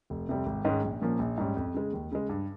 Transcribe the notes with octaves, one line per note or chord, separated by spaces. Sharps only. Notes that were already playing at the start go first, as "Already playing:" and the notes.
F1
F2 C3 G3 C4
G#1
G#2 D#3 G#3 C#4
A#1
A#2 F3 A#3 C#4
A#1
G#2 G3 C#4
F2
C#3 G#3
D#2
C#3 G#3
G2